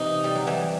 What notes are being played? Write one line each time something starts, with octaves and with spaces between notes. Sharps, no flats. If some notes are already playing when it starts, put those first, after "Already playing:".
Already playing: C3 E3 D#4
G3
F#3
E3 G3